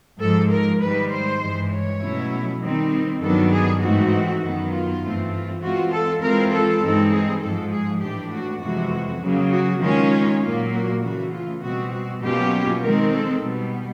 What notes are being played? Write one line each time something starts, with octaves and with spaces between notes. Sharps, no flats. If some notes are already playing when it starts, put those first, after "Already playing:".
G#2 F3 G#3 A4
A#4
G#2 D#3 G3 B4
C5
G2 E3 G#3
C#5
B2 F#3 A3 C#4 E4
D#3 G3 C4 D#4
G2 D#3 F#3 B3 D4 A4
G#4
G#2 E3 A3 C4 D#4 F#4
F#2 D#3 F#3 B3
F4
G2 E3 A3 C4
F4
E3 G#3 C4 F4 F#4
A4
E3 G#3 C4 F4 A#4
A4
G2 E3 G#3 C4 D#4
G#4
G#2 F3 G#3 A4
G#4
A2 E3 A3 D4 G4
F#4
F2 C3 E3 G#3 F#4
C#3 F#3 A#3
F#4
D#3 G#3 C#4 F4
A#2 F#3 A#3 F4
F#4
C#3 E3 A3 F#4
F4
B2 G3 C4 F#4
F#4
B2 F#3 A#3 C#4 F4 G4
D#3 G#3 C4 A#4
A4
B2 G3 B3